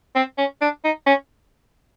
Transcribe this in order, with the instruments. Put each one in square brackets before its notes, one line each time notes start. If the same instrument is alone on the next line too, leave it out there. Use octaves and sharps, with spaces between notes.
[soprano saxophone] C4
C#4
D4
D#4
C#4